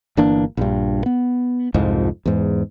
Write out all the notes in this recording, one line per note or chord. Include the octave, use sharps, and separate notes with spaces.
G1 E3 A#3 D4
A#1 G2
B3
C2 F2 G#2 F3
E2 G#2